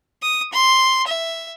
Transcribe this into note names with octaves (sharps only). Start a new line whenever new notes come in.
D#6
C6
E5